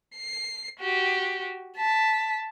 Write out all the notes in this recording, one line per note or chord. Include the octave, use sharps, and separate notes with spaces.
C7
F#4 G4
A5 B6